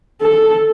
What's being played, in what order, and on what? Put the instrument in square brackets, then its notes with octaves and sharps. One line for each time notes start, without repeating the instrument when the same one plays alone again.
[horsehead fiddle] A4